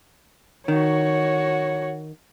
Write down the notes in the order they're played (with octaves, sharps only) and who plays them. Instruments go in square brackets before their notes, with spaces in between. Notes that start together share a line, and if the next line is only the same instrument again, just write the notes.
[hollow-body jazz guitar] D#3 [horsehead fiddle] F#4 C#5